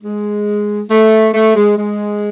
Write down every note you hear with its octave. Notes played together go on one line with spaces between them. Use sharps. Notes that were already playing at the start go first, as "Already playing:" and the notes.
G#3
A3
A3
G#3
G#3